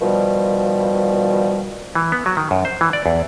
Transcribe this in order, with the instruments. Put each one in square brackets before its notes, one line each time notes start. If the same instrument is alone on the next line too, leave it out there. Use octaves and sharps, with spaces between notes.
[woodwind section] B2 D#3 F3 G3
[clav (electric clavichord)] E3
B3
F#3
D#3
F#2
C5
E3
D5
E2